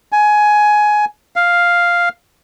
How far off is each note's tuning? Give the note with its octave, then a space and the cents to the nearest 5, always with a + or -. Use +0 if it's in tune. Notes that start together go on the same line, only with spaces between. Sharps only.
G#5 +15
F5 +0